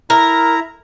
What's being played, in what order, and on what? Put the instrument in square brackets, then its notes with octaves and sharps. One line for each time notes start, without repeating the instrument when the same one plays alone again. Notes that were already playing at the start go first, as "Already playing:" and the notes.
[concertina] E4 A#5 [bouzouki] A#4